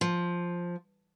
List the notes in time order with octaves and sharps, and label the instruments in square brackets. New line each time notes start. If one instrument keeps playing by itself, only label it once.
[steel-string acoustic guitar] F3